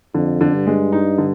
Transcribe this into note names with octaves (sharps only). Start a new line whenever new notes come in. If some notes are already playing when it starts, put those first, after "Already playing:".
F2 D3
D3
G2
G#3
D#4
D3